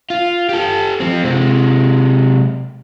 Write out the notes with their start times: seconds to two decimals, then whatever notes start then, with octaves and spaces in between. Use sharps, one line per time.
0.10 F4
0.49 G4 A4
1.00 F3 C4
1.24 C3 G#3